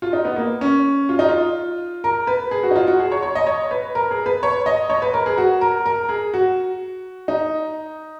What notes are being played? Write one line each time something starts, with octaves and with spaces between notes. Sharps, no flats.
F4
D#4
B3
A#3
C#4
F4
D#4
F4
A#4
B4
G#4
F#4
D#4
F4
F#4
G#4
C#5
C#5
D#5
C#5
B4
A#4
G#4
B4
C#5
D#5
C#5
B4
A#4
G#4
F#4
A#4
A#4
G#4
F#4
D#4